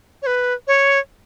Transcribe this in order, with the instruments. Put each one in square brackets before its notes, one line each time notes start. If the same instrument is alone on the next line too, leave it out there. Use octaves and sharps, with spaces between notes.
[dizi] C#5
B4
C#5